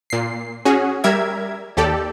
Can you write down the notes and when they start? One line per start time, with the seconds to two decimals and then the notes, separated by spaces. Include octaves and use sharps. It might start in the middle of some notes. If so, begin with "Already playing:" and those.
0.10 A#2 C7
0.65 C#4 F#4 G#4
1.04 G3 A#4 E5 G#6
1.77 D#2 G4 A4 D5